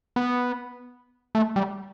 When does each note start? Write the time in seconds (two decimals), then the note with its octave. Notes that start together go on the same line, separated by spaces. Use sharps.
0.16 B3
1.35 A3
1.56 G3